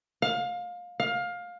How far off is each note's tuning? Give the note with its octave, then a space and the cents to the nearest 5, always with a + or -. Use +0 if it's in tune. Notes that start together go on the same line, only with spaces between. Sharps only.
F5 +25
F5 +20